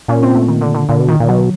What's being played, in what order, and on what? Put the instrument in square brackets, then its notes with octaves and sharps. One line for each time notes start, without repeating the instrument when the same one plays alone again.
[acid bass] A#2 [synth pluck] C#4
[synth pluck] C4
A3
D#3
D3
D3
[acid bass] A#2 [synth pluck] D3
[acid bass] B2
[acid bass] A#2 [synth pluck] D#3
[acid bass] A#2
[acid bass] B2 [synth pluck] F#3